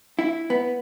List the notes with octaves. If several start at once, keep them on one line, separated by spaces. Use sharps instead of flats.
E4
B3